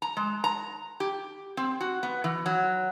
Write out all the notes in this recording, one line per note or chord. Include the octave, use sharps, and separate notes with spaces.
A#5
G#3
A#5
G4
C4
F#4
B3
E3
F#3